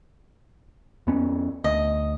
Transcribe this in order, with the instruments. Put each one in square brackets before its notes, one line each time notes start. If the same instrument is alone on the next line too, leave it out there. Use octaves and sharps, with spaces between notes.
[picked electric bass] F2 B3 C#4
[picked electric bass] D2 [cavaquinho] D#5